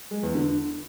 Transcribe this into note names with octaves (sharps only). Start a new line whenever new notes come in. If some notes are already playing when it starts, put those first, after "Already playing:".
G#3
E2
D3